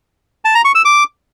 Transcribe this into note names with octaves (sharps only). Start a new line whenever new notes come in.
A5
A#5
C#6
E6
D6